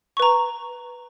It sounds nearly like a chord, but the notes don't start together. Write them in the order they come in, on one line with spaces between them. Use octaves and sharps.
C#6 B4 A#5